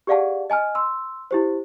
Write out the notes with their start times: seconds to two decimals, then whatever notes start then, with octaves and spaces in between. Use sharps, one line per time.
0.07 G4 G#4 D5 F5 F#5 A5
0.50 D#5 G#5 A5 F6
0.75 C6 E6
1.31 E4 G4 C5